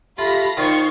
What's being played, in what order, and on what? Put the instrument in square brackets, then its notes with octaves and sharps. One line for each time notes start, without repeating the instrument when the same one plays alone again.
[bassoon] A3 [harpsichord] F4 [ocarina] G4 [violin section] F5 B5 A#6
[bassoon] A#2 [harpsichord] D#3 F4 [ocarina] D#4 [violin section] C5 F5 C#6